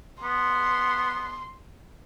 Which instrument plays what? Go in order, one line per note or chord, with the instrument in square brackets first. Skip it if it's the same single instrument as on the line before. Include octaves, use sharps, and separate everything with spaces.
[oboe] B3 [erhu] C6